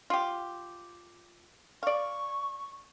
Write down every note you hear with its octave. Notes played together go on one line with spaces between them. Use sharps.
F4 G4
D5 F5 C#6